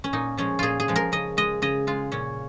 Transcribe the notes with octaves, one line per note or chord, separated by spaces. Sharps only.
C#4
A#2 D#4
F3 G#3 C#4
A#2 F4 G#4
G#4
F3 G#3
A#4
C#3 D#5
G#3 D#5
C#3 D#5
G#3 F4
A#2 C#4